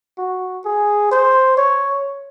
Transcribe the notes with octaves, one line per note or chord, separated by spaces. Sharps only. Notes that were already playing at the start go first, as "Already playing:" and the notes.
F#4
G#4
C5
C#5